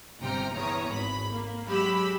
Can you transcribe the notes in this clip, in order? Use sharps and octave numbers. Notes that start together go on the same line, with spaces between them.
G1 C3 G5 A#5 F6
E2 C#5 A#5 D#6
G#1 B5
A#3
F#3 G#3 G4 B5 E6